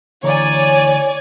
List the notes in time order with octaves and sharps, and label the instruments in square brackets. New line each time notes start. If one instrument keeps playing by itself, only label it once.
[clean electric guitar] D2 E3 A#5 [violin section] C#5 D5 G#5